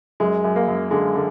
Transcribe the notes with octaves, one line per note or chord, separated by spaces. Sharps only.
F#2 G#3
F#2
A#3
F#2
D3 G#3
D3